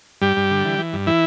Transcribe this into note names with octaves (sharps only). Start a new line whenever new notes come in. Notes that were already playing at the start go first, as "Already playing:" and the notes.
G2 G3 G4
G2
D3
E3
E3
G2
E3 E4